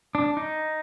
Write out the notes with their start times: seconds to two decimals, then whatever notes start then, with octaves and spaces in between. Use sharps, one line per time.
0.15 D4
0.37 D#4